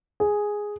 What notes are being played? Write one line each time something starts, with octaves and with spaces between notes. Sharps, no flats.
G#4